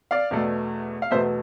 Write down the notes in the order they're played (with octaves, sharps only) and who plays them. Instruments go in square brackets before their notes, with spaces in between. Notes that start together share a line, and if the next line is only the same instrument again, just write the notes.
[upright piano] D5 F5
E2 B2 A3
F5
E2 B2 A3 C5 E5